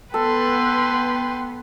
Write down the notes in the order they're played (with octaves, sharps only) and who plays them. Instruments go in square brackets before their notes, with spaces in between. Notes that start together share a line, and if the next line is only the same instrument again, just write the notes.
[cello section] B3 [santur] A4 [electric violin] B4 C6 [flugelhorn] G5